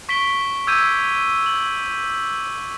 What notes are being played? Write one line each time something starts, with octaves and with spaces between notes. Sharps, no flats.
C#6 B6 D7 G7
D6 E6 G6 G#6 D#7
G#6 F#7